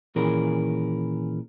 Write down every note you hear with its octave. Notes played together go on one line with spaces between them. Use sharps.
A#2 D#3 E3 C#4 G#4 A#4